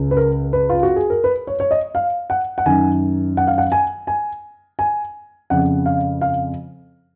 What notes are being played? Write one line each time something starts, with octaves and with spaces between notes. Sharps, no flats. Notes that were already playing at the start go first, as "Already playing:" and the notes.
Already playing: C#2 C#3
B4
A#4
B4
F4
F#4
G#4
A#4
B4
C#5
C#5
D#5
F5
F#5
F#5
F#2 D#3 G#5
F#5
F5
F#5
G#5
G#5
G#5
F2 C#3 F#5
F5
F5